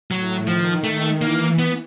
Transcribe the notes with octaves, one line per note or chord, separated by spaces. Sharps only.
A2 F#3
D#3 F3
D#3 A3
E3 A#3
B3